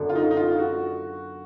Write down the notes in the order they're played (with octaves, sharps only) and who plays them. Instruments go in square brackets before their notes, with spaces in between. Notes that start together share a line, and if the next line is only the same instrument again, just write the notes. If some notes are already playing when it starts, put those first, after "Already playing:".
Already playing: [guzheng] F#2 D3 F#3 B3
[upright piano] F4
D#4
D#4
F4
F#4